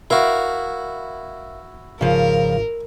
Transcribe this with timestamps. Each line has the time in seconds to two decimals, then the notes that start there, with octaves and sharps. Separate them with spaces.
0.10 E4 F#4 A#4 E5 F5
2.01 G#1 C#3 F3 A#4